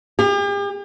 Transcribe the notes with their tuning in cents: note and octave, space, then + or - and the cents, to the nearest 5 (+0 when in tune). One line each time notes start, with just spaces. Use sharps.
G4 +45